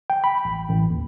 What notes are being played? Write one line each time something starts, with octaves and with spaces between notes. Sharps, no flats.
G5
B5
A1
A1
D#2